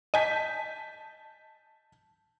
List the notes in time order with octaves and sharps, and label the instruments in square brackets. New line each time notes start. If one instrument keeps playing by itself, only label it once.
[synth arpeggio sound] D#5 G#5 [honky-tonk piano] A5 G6 B6